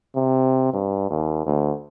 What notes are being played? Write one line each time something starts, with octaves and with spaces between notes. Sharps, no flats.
C3
G2
D#2
D2